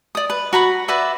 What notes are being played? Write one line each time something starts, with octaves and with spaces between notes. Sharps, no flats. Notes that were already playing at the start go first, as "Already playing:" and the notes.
D5 D#6
B4
F#4 A#5 B5
F#4 B4 D5 E5